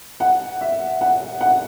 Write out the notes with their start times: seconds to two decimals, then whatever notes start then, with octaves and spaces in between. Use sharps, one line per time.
0.20 F#5
0.61 E5
1.01 F#5
1.41 F#5